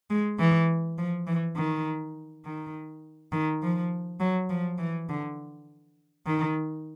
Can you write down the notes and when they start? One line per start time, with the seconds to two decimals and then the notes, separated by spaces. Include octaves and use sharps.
0.10 G#3
0.39 E3
0.98 F3
1.27 E3
1.56 D#3
2.45 D#3
3.32 D#3
3.62 F3
4.20 F#3
4.50 F3
4.79 E3
5.09 D3
6.26 D#3